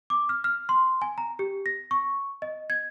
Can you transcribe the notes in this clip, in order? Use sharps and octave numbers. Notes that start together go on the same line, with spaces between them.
D6
F6
F6
C6
G#5
A#5
G4
A#6
C#6
D#5
G#6